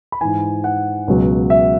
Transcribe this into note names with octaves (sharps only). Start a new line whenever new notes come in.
B5
G#2 E3 G#5
F#5
C#2 B2 F#3
E5